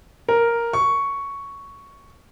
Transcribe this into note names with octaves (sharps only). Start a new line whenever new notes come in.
A#4
C#6